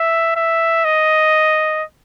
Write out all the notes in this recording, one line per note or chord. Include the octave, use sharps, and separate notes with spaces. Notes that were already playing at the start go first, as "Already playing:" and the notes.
Already playing: E5
E5
D#5